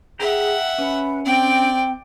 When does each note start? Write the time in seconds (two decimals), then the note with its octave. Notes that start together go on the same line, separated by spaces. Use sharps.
0.19 G#4 E5 F#5 G5 A#5
0.78 C#4 B4
1.25 C4 D5 G5